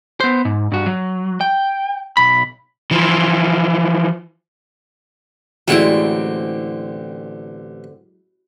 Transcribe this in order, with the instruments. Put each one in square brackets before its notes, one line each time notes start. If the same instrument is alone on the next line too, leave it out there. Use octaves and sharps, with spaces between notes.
[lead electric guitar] B3 C5
G#2
G2 F#4
F#3
G5
B1 B5
[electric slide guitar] E3 F3
[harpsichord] A1 G5 C#6 [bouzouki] D3 C4 [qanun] F#3 G#3 E4